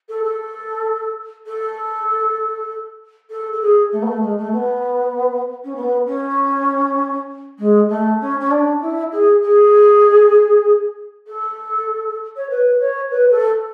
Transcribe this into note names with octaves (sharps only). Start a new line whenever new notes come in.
A4
A4
A4
A4
A4
G#4
A3
B3
A3
G#3
A3
B3
C#4
B3
C#4
G#3
A3
C#4
C#4
D4
E4
G#4
G#4
A4
C#5
B4
C#5
B4
A4